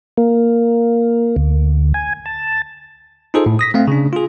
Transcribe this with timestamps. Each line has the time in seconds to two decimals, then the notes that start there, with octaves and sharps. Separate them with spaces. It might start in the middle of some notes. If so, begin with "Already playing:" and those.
0.17 A#3
1.36 D2
1.94 G#5
2.26 A5
3.34 D#4 F4 G#4 A4 C5
3.46 A2
3.59 D#6 A#6 B6
3.74 A3 C4 F5
3.87 C#3 D4
4.13 F4 G#4